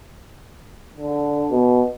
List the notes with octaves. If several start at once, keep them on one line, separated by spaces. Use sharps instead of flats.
D3
B2